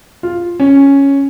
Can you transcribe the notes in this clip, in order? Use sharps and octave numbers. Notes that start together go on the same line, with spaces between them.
F4
C#4